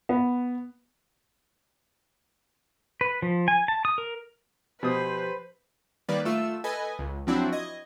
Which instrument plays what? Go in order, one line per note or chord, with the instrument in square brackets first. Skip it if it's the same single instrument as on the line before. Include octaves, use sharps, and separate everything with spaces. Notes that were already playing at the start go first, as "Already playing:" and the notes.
[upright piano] B3
[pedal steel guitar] B4
F3
G#5
A5
D#6
A#4
[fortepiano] B2 D#6 [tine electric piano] F3 G4 [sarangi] B4 [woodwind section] C5
[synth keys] D#3 G3 A#3 B4 D5
A3 F4 E6
A4 B4 D#5 G#5
C#2
F3 F#3 C4 D4 E4 F#4
D#5 G#6